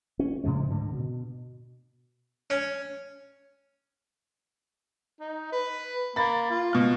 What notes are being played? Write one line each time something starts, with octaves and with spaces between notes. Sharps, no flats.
C#4
A2 C#3 F3 G#3
D2 G#2 D3
B2
C#4
D#4
B4
A#3 B5 A6
F4
B2 F6